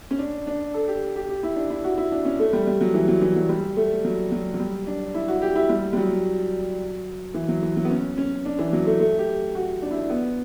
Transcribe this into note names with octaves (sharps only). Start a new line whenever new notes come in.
C#4
D4
D4
A4
G4
G4
G4
E4
D4
E4
F#4
E4
D4
C#4
A3
G3
G3
F#3
E3
F#3
E3
F#3
G3
A3
F#3
F#3
F#3
G3
D4
E4
F#4
G4
E4
G3
G3
F#3
E3
F#3
E3
F#3
B3
C#4
C#4
D4
E3
F#3
A3
A3
G4
F#4
D4
E4
D4
B3